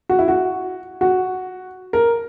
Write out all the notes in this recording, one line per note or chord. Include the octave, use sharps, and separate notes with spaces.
F#4
E4
F#4
F#4
A#4